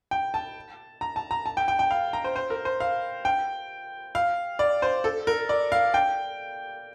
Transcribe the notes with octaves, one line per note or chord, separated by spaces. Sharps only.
G5
A5
A#5
A5
A#5
A5
G5
G5
G5
F5
A#5
C5
C5
A#4
C5
F5
G5
F5
D5
C5
A4
A#4
D5
F5
G5